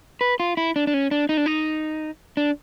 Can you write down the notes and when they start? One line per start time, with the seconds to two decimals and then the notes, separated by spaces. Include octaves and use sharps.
0.21 B4
0.40 F4
0.57 E4
0.76 D4
0.87 D4
0.94 C#4
1.11 D4
1.29 D#4
1.37 D4
1.46 D#4
2.37 D4